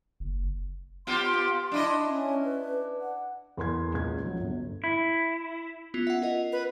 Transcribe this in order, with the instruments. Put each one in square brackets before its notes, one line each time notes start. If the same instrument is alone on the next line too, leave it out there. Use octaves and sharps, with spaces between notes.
[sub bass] F#1
[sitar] B3 F4 G4 [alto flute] C6
[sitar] D4 E4 D#5
[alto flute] C#4
B4
F#5
[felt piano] E2 A#4 C6 G#6
C#2 A#2 G#6
F3 F#3
G1
[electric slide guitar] E4
[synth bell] B3 C#4 F4
E5 F#5
F4 A#4 D#5
[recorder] B4